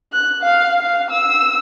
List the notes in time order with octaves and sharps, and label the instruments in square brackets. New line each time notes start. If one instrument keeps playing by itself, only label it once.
[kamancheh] F#6
F5
F5
E6